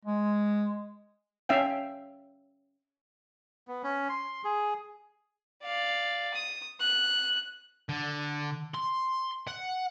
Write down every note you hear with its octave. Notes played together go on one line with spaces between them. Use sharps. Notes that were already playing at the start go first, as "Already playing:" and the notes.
G#3
C#4 E5 F5 G5
B3
C#4
C6
G#4
D5 F5
D#6
F#6
D3
C6
F#5